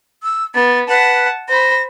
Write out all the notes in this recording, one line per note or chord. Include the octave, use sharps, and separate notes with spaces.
E6
B3 A6
B4 F#5 A5
C5 B5 A#6